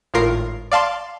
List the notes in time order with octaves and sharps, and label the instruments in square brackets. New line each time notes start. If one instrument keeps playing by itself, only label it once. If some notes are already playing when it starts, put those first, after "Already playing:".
[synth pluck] G#1 A2 F4 A#4 C7
D5 F5 A5 C6